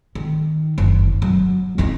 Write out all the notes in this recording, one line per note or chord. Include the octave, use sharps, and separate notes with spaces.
D#3
F#1
F#3
C#4 D#4